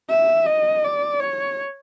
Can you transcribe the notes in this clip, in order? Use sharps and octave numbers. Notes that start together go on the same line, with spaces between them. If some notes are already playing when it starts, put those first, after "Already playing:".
E5
D#5
D5
C#5